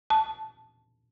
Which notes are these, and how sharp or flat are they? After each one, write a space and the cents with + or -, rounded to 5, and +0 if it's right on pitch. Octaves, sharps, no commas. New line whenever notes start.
A5 -5